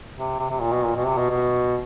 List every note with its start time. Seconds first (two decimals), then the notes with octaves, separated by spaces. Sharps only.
0.16 C3
0.39 C3
0.50 C3
0.61 A#2
0.73 B2
0.84 A#2
0.96 B2
1.07 C3
1.18 B2
1.30 B2